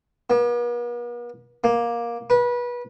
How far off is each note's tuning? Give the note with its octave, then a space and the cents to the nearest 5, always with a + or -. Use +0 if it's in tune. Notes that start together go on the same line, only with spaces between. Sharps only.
B3 -45
A#3 +15
B4 -25